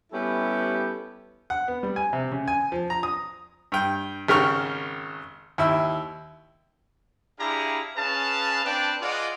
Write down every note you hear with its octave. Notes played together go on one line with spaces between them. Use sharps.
G3 B3 C#4 E4 G4 A4
F#5
B3
G3
G#5
C3
C#3
G#5
F3
A#5
D#6
G2 G5
G#1 C#3 A#4 G5 C#6 F6
D#2 E4 E6
D4 E4 G4 G#4 F5 A#5
C#4 G#4 B4 F5 A5
C4 D4 B4 D5 G5 A5
F4 G#4 D5 D#5 F#5